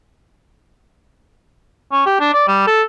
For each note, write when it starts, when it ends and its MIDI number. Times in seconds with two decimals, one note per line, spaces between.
1.92 2.06 61
2.06 2.20 67
2.20 2.30 62
2.33 2.46 74
2.48 2.65 55
2.67 2.82 69